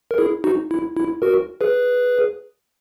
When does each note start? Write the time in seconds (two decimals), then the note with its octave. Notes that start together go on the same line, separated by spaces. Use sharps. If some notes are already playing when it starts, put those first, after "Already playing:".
0.11 A#4
0.18 E4 G#4
0.44 D#4 F#4
0.71 E4
0.97 E4
1.22 F#4 A#4
1.61 G#4 B4